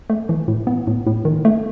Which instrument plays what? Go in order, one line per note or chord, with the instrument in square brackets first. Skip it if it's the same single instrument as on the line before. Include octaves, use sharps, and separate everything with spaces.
[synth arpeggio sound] A3
E3
A2
B3
A2
A2
D#3
A3